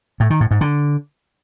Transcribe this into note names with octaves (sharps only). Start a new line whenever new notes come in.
A2
D#3
A2
G#2
D3